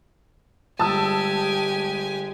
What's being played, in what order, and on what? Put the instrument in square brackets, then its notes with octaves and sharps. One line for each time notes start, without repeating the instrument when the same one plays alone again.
[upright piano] G1 D#6 [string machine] G#3 [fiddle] G4 G#5 [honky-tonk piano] A5 E6